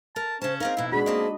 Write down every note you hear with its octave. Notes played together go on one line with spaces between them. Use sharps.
A#4 A5
C#3 C#4 C5 A5
C4 D#4 G#4 A#4 F5
F2 B2 E4
G#3 D4 F#4 G#4 B5
A#3 C4 D#5 A5